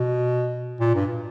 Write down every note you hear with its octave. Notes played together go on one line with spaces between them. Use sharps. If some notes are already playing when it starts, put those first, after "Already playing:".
Already playing: B2
A#2
G2